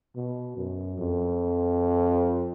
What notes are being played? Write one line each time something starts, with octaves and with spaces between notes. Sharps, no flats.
B2
F#2
F2